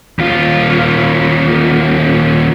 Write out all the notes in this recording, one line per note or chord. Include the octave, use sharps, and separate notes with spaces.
D#2 F4